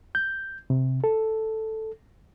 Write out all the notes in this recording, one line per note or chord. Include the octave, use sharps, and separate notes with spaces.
G6
C3
A4